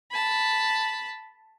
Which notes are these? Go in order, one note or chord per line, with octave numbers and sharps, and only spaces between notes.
A5 B5